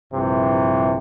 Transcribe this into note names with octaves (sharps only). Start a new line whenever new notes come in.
A#1 G2 C3 E3